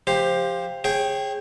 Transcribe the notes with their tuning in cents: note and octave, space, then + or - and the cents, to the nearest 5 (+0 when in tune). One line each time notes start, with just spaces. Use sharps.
F3 +0 G4 +20 C5 +5
G#4 +0 C#5 -30 G5 +0